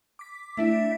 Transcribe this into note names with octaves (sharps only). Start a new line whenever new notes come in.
D6 B6
A3 D4 E4 E5